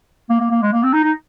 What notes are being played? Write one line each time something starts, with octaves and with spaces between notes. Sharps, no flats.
A#3
A#3
A#3
G#3
A#3
C4
D#4
D#4